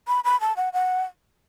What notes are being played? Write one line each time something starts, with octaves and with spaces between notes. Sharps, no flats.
B5
B5
A5
F#5
F#5